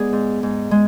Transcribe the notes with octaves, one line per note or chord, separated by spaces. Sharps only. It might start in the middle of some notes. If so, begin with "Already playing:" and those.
Already playing: G#3 B3 G#4 D5
G#2
G#2
G#3